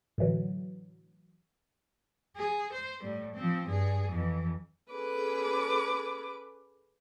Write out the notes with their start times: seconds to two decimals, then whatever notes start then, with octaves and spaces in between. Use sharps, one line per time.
0.18 A2 D3 E3 F#3
2.36 G#4
2.73 C5
3.03 A2 G3
3.34 F3 C4
3.68 G2 G#4
4.10 F2 E3
4.91 C#4 G#4 A4 B4 D6